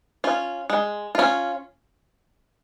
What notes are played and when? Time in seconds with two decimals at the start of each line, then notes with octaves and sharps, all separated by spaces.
0.24 C#4 F4
0.70 G#3
1.15 C#4 F4